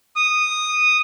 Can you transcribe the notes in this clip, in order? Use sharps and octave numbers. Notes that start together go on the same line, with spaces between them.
D#6